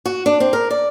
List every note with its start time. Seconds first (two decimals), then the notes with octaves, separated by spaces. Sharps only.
0.06 F#4
0.26 D4
0.40 C4
0.53 A#4
0.71 D5